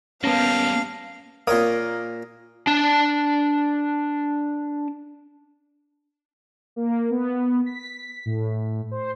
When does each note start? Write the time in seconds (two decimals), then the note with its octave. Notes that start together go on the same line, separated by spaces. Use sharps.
0.24 G3 A#3 B3 C#4 F5 A5 A#6
1.47 A#2 A#3 C#5 D#6
2.67 D4 A5
6.76 A#3
7.11 B3
7.66 B6
8.25 A2
8.91 C5